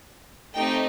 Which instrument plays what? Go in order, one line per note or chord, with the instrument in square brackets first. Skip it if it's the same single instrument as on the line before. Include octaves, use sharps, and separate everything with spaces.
[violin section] A3 C4 D#4 G4 G5